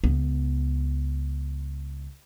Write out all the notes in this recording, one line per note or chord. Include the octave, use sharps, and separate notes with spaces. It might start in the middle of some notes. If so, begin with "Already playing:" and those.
C#2 B3